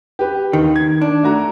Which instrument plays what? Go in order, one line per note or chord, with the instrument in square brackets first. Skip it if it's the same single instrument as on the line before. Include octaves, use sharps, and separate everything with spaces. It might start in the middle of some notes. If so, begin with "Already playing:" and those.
[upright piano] G4 B4
[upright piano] D#2 [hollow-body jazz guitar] D#3
[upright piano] G#6
[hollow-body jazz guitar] D4
[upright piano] A3 F#4 A#5